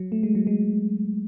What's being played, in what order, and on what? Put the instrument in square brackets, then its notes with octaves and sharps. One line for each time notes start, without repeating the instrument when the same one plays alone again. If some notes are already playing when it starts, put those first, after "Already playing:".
Already playing: [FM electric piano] F#3
A3
G#3
F#3
G#3